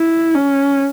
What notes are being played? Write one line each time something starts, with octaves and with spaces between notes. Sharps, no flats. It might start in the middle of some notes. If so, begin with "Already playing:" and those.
Already playing: E4
C#4